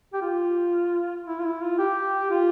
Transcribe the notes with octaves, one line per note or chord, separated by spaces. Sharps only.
G4
F4
E4
F4
E4
F4
G4
F4